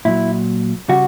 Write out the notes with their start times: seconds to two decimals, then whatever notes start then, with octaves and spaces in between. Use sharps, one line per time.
0.05 A#2 F#3 E4
0.88 C#3 G3 F#4